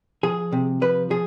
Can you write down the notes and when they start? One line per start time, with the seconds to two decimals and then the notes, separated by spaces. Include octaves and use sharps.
0.23 F3 G#4
0.52 C3
0.81 F3 B4
1.11 F3 G#4